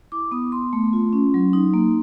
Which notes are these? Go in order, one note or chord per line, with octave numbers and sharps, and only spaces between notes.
E4 D6
B3 D#6
B3 C6
A3
F4
C#4
F#3
D#4
A#3